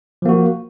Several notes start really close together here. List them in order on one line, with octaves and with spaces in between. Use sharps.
F3 A#3 F#4